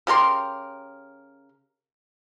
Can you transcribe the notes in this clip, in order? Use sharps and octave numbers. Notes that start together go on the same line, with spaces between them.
C#3 G4 A#4 C6